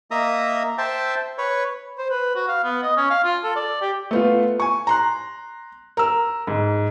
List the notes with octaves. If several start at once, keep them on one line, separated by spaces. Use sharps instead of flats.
A#3 D#5 E5 A#5 D#6
C5 E5 G5 A5
B4 C#5
C5
B4
F#4
F5
B3
D#5
C#4
F5
F4
A4
D5
G4
A3 B3 F4
G#5 C#6
A#5 C6 F#6
A#4 E6
G#2